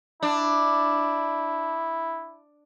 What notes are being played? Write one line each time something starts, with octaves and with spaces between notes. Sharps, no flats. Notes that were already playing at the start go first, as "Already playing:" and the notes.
D4 E4